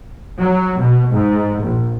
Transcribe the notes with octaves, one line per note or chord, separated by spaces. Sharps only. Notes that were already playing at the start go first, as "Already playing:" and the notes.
F#3
B2
G#2
A#1